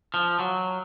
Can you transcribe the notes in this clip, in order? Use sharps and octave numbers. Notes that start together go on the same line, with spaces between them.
F3
F#3